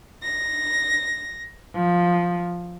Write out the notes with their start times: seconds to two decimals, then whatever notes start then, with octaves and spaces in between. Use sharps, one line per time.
0.23 A#6
1.76 F3